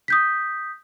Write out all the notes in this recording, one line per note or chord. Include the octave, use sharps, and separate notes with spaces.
D#6 G6 B6